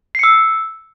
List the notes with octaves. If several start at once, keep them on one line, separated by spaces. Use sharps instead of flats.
E6 C7 C#7